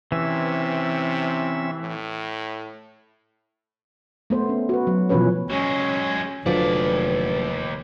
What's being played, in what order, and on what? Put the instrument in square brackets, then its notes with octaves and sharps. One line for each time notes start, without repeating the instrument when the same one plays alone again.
[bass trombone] C3 [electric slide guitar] E3 [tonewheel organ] C4 C#4 E5
[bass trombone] A2
[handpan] A3 B3 C5
C#4
F#4 B4
F#3
B2 E3 F3 C#4 B4 C#5
[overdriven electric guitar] F#3 G#3 [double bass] C#4
[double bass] F1 [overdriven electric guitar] D#2 D5 [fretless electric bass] D3 F3 F#3 [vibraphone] B4